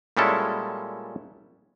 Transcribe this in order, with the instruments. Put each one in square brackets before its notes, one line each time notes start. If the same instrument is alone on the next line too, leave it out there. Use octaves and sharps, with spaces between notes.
[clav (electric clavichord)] A#2 G3 G#3 C#4 E4 A4